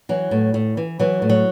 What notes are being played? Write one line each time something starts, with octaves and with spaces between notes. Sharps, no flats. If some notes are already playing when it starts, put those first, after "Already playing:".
E3 F#3
A2
A2
E3
E3 F#3
A2
F#3